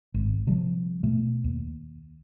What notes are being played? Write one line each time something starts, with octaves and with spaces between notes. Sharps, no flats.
G#1
C3 F3 G3
B2 A3
D#2